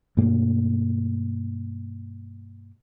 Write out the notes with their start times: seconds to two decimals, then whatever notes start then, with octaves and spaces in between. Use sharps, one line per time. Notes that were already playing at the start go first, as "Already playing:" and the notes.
0.17 G2 B2 A3 A#3